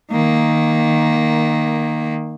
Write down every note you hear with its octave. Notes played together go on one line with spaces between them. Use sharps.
D#3 A#3